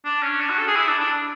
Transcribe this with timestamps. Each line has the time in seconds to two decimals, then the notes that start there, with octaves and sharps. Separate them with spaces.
0.05 D4
0.23 C#4
0.40 D4
0.49 F#4
0.59 A4
0.67 G#4
0.76 E4
0.88 D4
0.99 D4